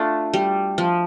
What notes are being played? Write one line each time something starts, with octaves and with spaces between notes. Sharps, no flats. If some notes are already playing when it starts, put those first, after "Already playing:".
Already playing: A3 D4 F4
G3
F3